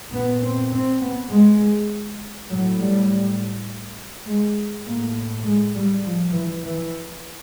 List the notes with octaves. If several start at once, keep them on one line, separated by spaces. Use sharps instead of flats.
A#2 B3
C4
C4
B3
G#3
A2 F#3
G3
G#3
A2 A#3
G#3
G3
F3
E3
E3